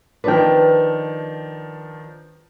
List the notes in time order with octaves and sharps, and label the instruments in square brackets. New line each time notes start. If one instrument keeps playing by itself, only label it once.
[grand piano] D#3 F3 D4 [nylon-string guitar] B4 G5